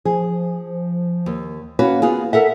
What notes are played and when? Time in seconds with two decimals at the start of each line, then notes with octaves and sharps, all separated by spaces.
0.05 F3 G#4
1.26 D#2
1.79 A#3 C#4 F#4 B4
2.02 B3 F4 G#4
2.33 A4 A#4 E5 F#5